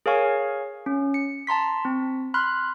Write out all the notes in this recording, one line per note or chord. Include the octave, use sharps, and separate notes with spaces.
G#4 A#4 C#5 F5 G#5 C#6
C#4
C#7
A5 A#5 C6 B6
C4
B5 C6 F6 F#6